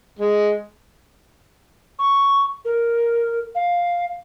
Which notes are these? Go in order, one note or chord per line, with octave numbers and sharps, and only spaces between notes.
G#3
C#6
A#4
F5